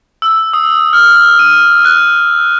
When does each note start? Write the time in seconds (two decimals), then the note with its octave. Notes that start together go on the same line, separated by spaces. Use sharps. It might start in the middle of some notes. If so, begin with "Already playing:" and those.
0.22 E6
0.53 D#6
0.93 F6
1.39 D#7
1.85 F#6